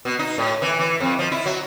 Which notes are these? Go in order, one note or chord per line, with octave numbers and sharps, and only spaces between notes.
B2
D#4
A2
E3
E3
F2
F3
E4
F#3